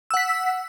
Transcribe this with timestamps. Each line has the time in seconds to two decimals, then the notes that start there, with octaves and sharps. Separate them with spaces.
0.11 E6
0.14 F#5
0.17 B6